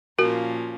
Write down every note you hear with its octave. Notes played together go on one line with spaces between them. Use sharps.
A#2 F3 A#3 C#4 F#4 A#4